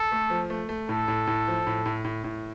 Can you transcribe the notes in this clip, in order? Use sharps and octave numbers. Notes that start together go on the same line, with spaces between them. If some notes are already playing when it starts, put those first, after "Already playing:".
Already playing: A4
A3
F3
A3
A3
A2 A4
A2
A2
F3
A2
A2
A2
A2